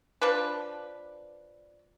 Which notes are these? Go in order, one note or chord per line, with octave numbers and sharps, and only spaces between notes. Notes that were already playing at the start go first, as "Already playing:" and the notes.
F3 D4 B4